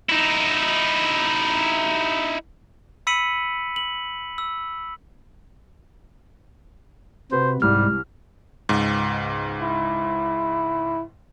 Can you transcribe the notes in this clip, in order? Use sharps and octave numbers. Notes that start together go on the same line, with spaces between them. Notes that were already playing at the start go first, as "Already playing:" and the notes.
D#4 E4
B5 E6 B6 C#7 D#7 F#7
F#7
E6
C3 F#4 B4 C5
C2 G#2 G3 F6
C#2 G#2
E4